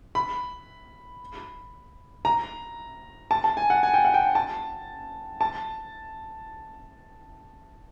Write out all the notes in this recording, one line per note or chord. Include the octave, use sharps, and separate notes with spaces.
B5
A#5
A5
A5
G#5
F#5
G#5
G5
F#5
G5
A5
A5